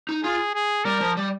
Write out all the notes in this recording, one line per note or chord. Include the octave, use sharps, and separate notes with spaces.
D#4
F4 G#4
G#4
G3 A#4
F3
G3